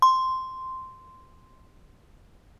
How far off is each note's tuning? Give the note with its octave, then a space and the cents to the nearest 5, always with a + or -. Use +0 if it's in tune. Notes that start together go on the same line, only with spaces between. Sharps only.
C6 -5